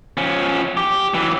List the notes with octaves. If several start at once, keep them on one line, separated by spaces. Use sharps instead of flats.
F3 C#4
G4
E3 F#3